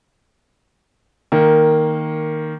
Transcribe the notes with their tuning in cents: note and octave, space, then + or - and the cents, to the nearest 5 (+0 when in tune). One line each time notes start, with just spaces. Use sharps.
D#3 +0 A#3 -5